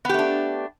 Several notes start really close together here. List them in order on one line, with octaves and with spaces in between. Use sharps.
B3 G4 A3 D4